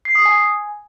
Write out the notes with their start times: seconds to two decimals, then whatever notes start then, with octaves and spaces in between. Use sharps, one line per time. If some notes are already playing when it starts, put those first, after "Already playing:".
0.05 C7
0.15 D#6
0.25 G#5